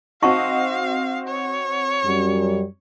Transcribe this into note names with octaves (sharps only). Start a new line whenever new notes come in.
C4 D#4 F#4 D#5 F5 C#6
C#5
F#2 G3